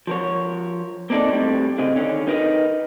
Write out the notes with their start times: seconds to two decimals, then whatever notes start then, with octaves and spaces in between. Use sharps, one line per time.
0.07 F3 A#4 C#5
1.10 A#3 C4 D4 D#4 A4 D5
1.29 A2 G3 C4
1.78 C#3 C4 D#5
1.96 D3 D#3 C#4
2.27 D#4 A#4 B4 D#5